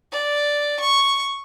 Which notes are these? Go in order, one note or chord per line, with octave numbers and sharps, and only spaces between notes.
D5
C#6